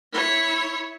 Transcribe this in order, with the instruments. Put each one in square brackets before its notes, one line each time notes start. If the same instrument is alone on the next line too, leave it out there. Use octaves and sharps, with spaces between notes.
[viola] E4 C#5